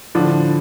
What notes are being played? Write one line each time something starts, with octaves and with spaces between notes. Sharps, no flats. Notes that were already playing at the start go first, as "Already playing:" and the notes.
A2 D3 F3 D4